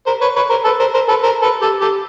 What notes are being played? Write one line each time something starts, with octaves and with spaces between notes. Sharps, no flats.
A#4 C5
B4 C#5
B4 C#5
A#4 C5
A4 B4
A#4 C5
A#4 C5
A4 B4
A#4 C5
A4 B4
G4 A4
G4 A4